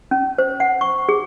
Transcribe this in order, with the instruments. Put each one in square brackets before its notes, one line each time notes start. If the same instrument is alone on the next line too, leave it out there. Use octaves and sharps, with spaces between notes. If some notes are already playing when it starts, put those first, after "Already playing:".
[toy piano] C#4
C5
F#5
C#6
G#4